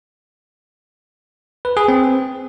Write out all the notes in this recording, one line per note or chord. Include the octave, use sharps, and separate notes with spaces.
B4
G#4
C4